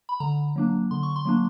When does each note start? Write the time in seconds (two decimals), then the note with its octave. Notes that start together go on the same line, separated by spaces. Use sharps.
0.09 B5
0.20 D3 A#5
0.56 F#3 A#3 D4
0.91 D3 C6
1.03 C#6
1.16 C6
1.25 F#3 A#3 D4